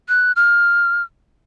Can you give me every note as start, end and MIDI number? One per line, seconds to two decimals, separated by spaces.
0.09 0.32 90
0.36 1.02 89